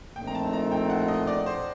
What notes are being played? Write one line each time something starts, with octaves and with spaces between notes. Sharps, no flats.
A#1 A#2 A3 C4 D#4 G5
A#5
A5
A#5
G5
F#5
D#5
D5
C5